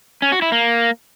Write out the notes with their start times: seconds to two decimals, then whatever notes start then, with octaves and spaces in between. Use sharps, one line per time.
0.22 C#4
0.32 F#4
0.42 E4
0.52 A#3